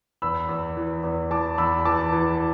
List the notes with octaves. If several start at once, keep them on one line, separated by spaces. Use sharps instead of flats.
E2 B5 E6
E2
E3
E2
E3 A5 D6
E2 B5 E6
E3 A5 D6
E3